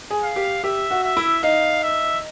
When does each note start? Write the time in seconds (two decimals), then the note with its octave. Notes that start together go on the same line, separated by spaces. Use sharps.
0.11 G#4
0.23 F5
0.36 G4
0.63 G4 E5
0.91 F#4
1.03 E5
1.17 E4
1.43 D#4 F5
1.83 E5